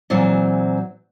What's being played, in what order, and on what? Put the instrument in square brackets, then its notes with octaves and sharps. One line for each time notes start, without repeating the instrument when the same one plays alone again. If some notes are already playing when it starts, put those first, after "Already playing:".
[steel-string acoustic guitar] A#2 E3 F#3 C4